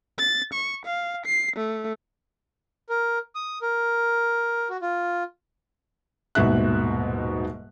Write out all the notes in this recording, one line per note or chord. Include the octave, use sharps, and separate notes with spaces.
A6
C#6
F5
C7
A3
A#4
D#6
A#4
F#4
F4
D#1 G#2 B2 F#4 E5 F#6